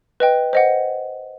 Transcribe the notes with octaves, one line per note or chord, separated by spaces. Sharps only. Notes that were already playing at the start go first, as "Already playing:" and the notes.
B4 D#5 G5
C5 D#5 F#5